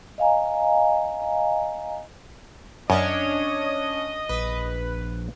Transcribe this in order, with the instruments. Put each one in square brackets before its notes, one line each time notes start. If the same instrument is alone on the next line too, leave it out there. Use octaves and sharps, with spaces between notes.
[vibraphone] D#5 F5 G#5 A#5
[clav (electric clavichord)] F#2 [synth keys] C#4 D4 C#5 [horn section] D#5
[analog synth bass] A#1 [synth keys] B4